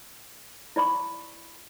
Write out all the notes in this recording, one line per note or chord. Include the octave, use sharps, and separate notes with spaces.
E4 D5 B5 C#6 D6